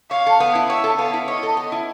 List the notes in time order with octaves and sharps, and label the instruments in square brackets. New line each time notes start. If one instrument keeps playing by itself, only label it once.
[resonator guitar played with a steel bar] C#5 [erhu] F5
[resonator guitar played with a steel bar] A4
B3
E4
[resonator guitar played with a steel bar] C#5 [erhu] E5
[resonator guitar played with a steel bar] A4
[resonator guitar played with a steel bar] B3 [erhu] F5
[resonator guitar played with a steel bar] E4
[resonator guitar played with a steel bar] C#5 [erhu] D#5
[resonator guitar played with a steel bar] A4
B3
E4